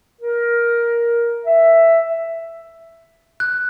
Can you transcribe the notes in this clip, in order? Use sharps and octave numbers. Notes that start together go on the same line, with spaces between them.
A#4
E5
F#6